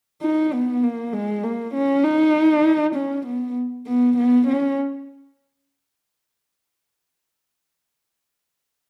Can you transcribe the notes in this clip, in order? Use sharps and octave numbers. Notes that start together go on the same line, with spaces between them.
D#4
B3
A#3
G#3
A#3
C#4
D#4
C#4
B3
B3
B3
C#4